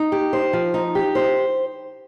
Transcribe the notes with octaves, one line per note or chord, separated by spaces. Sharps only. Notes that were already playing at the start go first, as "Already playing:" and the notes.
Already playing: D#4
G4
C5
F3
D#4
G4
C5